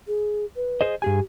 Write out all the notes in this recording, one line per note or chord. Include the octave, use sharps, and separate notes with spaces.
G#4
B4
G#4 C5 D#5
G2 G4 G#4 G#5